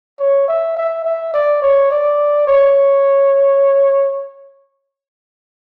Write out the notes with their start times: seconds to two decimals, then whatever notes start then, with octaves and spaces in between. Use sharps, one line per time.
0.19 C#5
0.48 E5
0.77 E5
1.05 E5
1.34 D5
1.62 C#5
1.90 D5
2.48 C#5